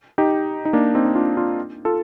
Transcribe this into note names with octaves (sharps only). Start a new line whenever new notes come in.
D#4 G4
D#4
A#3 D4
C4 D#4
D#4
D4 F4
D4 F4
F4 A4